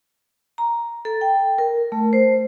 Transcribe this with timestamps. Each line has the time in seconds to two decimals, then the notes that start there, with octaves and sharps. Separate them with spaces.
0.58 A#5
1.05 A4
1.21 G5
1.58 A#4
1.92 A3
2.13 C5